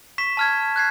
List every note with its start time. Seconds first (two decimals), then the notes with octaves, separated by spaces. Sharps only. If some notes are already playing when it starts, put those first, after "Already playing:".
0.18 C#6 B6 E7
0.37 A5 F6 G#6
0.76 F#6 G#6 C7